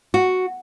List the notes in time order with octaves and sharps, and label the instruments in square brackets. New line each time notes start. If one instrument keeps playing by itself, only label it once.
[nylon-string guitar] F#4